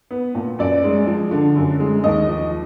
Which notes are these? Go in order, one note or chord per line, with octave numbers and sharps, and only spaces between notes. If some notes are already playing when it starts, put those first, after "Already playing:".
B3
A#2
F#2 D5
G#3
F3
D3
F#2
G#3
D#2 D#5
F3